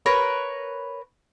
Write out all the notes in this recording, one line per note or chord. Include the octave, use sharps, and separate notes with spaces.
A#4 B4 C#5